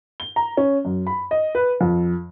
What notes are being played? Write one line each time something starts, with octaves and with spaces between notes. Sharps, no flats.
G7
A#5
C#4
F#2
B5
D#5
B4
F2